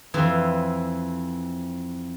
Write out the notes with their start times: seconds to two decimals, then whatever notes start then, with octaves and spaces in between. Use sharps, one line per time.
0.14 F2 E3 F4